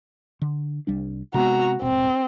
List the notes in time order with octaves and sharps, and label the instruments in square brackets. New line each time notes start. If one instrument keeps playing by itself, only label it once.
[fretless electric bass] D3
C2 G3 D4
[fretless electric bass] C3 G#3 B3 [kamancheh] F#4 A#5
[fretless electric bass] D#1 G#1 B2 [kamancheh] C4